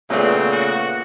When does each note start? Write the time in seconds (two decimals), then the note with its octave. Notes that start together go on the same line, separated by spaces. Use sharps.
0.10 A#2 C#3 A3 B3 C4
0.51 F#4